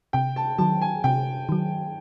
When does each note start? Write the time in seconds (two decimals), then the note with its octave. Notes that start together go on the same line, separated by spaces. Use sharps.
0.13 C3 G5
0.36 A5
0.58 D#3 F#3 A5
0.81 G#5
1.04 C3 G5
1.49 D#3 F#3